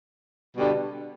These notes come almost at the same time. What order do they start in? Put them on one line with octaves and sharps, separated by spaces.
B2 G3 D3